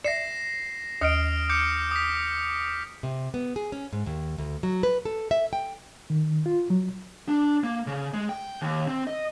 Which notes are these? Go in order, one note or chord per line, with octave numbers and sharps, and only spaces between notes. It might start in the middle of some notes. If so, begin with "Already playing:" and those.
D5 E5 A#6 C7 E7
D#2 D#5 D#6 F6 D7
D6 G6 C#7
D#6 B6
C3
B3
G#4
C#4
G#2
D#2
D2
F#3
B4
A4
E5
G5
D#3
F4
F#3
D4
A#3
C#3
G#3
G5
D#2
C4
D#5